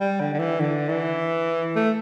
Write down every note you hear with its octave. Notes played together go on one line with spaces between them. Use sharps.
G3
D3
D3
E3
D3
E3
A3